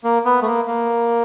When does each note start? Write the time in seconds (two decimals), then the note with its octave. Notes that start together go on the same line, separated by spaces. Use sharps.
0.04 A#3
0.25 B3
0.42 A3
0.46 A#3
0.67 A#3